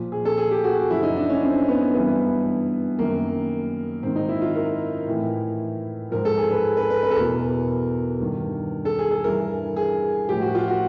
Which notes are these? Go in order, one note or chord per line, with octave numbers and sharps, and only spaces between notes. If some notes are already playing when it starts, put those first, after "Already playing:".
Already playing: A#2 F3
G#4
A4
G#4
G4
F#4
F#4
F#2 C#3 F3 E4
D#4
D4
C#4
C4
B3
G2 E3 B3
F#2 D#3 A#3
G#2 D#3 C4
D#4
E4
F4
A#4
A2 E3
G#2 F3 A#4
A4
G#4
B4
B4
B4
B4
A4
E2 B2 A#4
G2 D#3
A4
G#4
A4
G2 E3 A#4
G#4
A2 F3 G4
F#4
F4
F#4